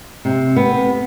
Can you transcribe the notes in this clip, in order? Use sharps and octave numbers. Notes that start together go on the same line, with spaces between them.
C3
B3